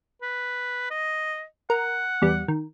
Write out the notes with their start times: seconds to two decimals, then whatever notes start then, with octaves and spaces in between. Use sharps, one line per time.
0.22 B4
0.90 D#5
1.70 A#4 F#5
2.22 E2 G3
2.48 D#3